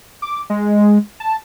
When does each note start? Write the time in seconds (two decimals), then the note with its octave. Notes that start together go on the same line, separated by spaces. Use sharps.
0.22 D6
0.50 G#3
1.20 A5